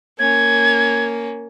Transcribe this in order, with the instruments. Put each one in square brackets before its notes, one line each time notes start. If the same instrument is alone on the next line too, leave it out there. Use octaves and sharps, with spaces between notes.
[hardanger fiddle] A#3 C#4 [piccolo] G#6